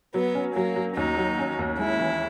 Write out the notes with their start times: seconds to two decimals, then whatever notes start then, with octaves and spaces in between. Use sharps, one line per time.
0.14 F#3 B3
0.35 C#4
0.56 F#3 A#3
0.76 F#3
0.96 D#2 D#4
1.18 F#3
1.39 C#4
1.59 D#2
1.79 G#3 E4
2.00 E3